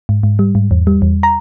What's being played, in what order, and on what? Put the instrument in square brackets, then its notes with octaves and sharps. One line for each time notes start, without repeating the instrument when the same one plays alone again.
[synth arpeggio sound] G#2
G#2
G3
G#2
E2
G3
E2
A#5